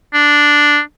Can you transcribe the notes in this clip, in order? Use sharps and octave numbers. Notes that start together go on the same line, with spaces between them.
D4